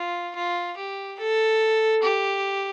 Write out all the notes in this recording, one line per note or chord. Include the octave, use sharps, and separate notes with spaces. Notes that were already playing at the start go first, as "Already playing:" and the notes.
Already playing: F4
F4
G4
A4
G4